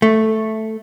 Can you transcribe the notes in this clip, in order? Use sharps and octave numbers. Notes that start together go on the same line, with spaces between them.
A3